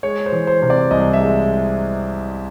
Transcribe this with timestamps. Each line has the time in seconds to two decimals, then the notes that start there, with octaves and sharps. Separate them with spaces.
0.03 G#3 C#5
0.26 C5
0.32 E3
0.47 C5
0.62 C3
0.70 D5
0.91 C2 D#5
1.13 E5
1.20 G#3